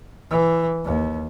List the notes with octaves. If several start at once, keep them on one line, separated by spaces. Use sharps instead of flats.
E3
D#2